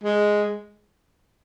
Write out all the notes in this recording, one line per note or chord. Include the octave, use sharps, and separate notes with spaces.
G#3